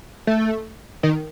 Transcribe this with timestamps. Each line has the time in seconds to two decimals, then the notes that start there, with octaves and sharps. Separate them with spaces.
0.27 A3
1.03 D#3